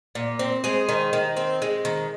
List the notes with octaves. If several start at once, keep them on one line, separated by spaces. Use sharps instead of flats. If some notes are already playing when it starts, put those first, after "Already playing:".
A#2
C4
G#3 G#4 C5
D#3
D#3
C4
G#3
D#3